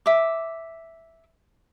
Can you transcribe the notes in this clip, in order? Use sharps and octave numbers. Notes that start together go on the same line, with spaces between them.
E5 D6